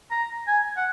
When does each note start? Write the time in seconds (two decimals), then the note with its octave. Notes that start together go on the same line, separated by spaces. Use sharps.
0.11 A#5
0.47 G#5
0.77 F#5